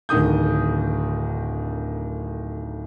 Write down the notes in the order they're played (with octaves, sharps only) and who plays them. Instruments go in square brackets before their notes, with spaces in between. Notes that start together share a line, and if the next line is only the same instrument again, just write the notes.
[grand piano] D1 D3 D#3 D#6 G6